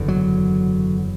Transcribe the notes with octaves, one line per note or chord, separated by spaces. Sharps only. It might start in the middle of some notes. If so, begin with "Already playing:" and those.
Already playing: F#1 E2 D3
F#3